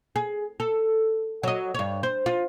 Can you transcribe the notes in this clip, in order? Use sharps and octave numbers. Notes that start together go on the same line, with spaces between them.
G#4
A4
F#3 D#5
G2 C#5
C5
F4